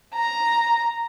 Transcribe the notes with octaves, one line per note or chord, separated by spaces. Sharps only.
A#5